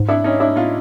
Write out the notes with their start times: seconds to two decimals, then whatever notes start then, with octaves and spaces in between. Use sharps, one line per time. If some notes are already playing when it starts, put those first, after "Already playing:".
Already playing: G#2
0.09 D4 E4
0.24 C#4 D#4
0.40 D4 E4
0.56 A2 D#4 F4